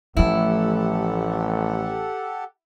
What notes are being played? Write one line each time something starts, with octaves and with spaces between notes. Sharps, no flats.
A1 F3 A3 E4 G4 A4 F#5